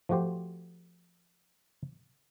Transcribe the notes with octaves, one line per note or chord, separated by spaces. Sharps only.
F3 A3 F#4 G4 C5